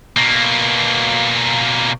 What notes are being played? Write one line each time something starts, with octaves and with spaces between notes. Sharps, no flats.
B2 A#3